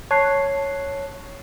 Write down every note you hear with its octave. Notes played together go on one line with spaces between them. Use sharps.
C#5 A5 F#6 C7